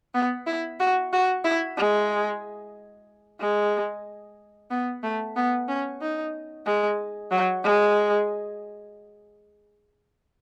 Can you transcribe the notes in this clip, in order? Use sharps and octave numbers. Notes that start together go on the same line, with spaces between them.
B3
E4
F#4
F#4
E4
G#3
G#3
B3
A3
B3
C#4
D#4
G#3
F#3
G#3